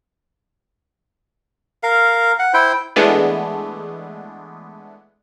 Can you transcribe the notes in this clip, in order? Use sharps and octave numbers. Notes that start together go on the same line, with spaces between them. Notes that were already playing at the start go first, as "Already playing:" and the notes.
A#4 F5
F#5
E4 C5 G5
E3 G#3 A3 B3 D4